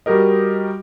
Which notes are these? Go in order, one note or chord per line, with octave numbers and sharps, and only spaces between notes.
G3 F#4 G4 A#4 D#5